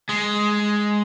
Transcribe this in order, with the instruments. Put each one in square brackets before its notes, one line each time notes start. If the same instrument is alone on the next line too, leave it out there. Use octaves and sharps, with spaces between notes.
[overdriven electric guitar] G#3